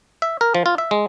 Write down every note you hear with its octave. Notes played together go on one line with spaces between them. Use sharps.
E5
A#4
F3
F4
E5
G#3